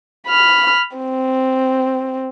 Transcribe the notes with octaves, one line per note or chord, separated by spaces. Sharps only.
B5 F6
C4